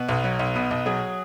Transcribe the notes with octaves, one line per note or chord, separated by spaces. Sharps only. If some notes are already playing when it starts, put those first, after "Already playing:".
Already playing: B2 B4
B1
F#3
B1
B2
B1
F#3 G#4